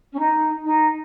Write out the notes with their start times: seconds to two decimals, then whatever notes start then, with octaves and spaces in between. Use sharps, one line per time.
0.14 C#4
0.20 D#4
0.65 D#4